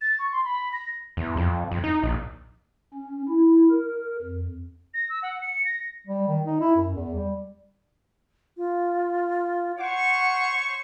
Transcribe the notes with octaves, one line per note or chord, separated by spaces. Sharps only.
A6
C#6
C6
B5
A#6
E2
F2
F2
D#4
A#1
C#4
E4
A#4
F2
A#6
E6
F#5
C#7
C#7
A#6
G3
D#3
D#4
E4
F#2
E2
G3
F4
C5 C#5 F#5 C#6